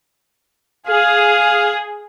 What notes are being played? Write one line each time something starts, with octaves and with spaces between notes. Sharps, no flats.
G#4 F5